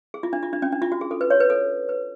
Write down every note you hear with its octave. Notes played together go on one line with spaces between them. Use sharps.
G#4
F4
D4
F4
D4
C#4
D4
F4
F#4
G#4
A4
B4
C#5
B4
A4
B4